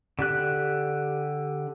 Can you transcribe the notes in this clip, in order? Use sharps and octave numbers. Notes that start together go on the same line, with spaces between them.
D3 G4 F#6